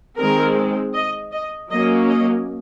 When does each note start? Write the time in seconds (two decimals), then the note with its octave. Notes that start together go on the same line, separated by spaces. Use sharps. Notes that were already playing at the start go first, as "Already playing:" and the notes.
0.16 D#3 G#3 C4 A#4
0.93 D#5
1.32 D#5
1.70 F#3 A#3 C#4 D#5
2.09 D#5